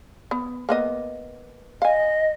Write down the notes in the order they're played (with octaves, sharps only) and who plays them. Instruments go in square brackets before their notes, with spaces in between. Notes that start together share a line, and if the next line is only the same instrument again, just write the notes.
[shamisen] B3
A#3 B3 D#5
[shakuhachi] D#5 [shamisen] F5 G#5